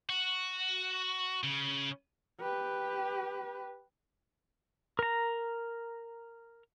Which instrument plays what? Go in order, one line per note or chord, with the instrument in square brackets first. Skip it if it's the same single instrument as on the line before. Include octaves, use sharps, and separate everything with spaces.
[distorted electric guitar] F#4
C#3
[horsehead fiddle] G4 B4
[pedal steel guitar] A#4 A#5